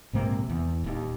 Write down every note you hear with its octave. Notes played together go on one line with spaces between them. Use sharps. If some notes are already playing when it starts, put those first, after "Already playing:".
A#1 G#2 C3 A#3
E2
D#1 D#2